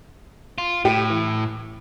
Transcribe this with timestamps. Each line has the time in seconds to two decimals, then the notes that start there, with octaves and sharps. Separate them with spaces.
0.58 F4
0.85 A2 G4
1.10 E3